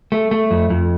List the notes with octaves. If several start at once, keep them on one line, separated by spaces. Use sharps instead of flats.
A3
A3
F2
F2